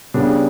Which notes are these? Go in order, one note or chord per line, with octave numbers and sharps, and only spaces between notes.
C#3 G3 B3 D4